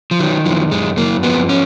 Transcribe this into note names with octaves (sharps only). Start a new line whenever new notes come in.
F3
D#3 F#3
F#2 F3
F#2 G#3
F#2 A#3
F3 B3
C#4